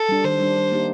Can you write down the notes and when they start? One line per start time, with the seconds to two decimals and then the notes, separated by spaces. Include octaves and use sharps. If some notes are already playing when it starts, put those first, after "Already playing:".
Already playing: A4
0.09 G3 D4
0.24 D#3 C5
0.40 G3 D4
0.56 G3
0.72 A#3 D#4 G4